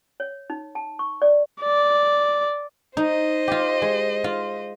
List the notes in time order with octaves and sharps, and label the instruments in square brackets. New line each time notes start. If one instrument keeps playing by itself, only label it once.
[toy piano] C#5
D#4
A5
C#6
D5
[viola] D5
[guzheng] D#4 [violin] C5 D#5
[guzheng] F4 G4
G#3
F4